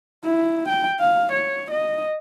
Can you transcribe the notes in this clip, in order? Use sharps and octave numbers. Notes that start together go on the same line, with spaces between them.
E4
G5
F5
C#5
D#5